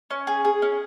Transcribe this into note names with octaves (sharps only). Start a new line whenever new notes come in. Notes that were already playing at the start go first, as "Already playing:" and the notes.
C#4
G#4
G#4
C#4